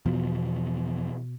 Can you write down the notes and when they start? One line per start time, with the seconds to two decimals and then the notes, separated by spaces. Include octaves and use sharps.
0.06 E2 B2 F3